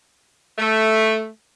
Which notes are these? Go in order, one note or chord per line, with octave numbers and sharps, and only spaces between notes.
A3